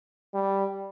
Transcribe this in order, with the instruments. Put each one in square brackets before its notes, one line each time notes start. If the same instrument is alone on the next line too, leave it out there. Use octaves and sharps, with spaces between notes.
[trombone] G3